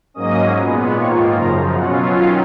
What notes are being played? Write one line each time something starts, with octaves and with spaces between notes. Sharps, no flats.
G#2 F#3 A#3 C#4 D#5 D#6
A#2 G#3 B3
G#2 D#3 A#3 F4 C#5 C#6
F#2 C#3 F3 A#4 A#5
B2 F#3 C#4 F4 F#4 F#5
D#3 F#3 C#4 F4 F5